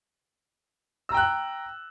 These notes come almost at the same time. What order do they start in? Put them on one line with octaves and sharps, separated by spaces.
E6 A#5 G5 F#6